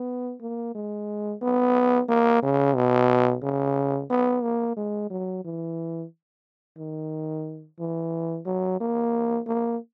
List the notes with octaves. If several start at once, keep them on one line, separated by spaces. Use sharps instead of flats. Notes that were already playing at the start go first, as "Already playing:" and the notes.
Already playing: B3
A#3
G#3
B3
A#3
C#3
B2
C#3
B3
A#3
G#3
F#3
E3
D#3
E3
F#3
A#3
A#3